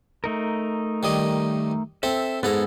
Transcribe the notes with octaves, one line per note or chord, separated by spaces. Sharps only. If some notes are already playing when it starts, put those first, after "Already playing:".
A3 D#4 A#4
D#3 G3 D#5
C4 A4 E5
G#2 B3 G#4 A4 A#5 E6